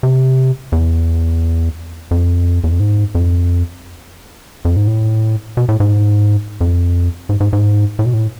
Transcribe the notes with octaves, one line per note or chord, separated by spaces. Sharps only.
C3
E2
F2
E2
F2
G#2
F2
F2
G#2
A2
B2
A2
G#2
F2
G#2
G#2
G#2
A2
B2
A2